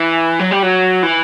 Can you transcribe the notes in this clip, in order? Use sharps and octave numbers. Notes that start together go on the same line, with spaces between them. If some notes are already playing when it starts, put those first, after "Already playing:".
Already playing: E3
F#3
G3
F#3
E3